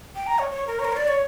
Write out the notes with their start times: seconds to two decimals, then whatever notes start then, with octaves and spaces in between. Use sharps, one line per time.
0.16 G5
0.27 A#5
0.39 C#5
0.51 C#5
0.67 A#4
0.79 C#5
0.85 A#4
0.92 C#5
0.97 D5
1.08 C#5